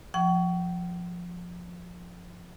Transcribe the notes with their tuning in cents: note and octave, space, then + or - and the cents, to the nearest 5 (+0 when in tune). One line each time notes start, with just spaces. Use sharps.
F3 +10 G5 -45 C#6 +20